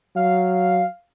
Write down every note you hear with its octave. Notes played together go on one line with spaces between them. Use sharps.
F#3 F5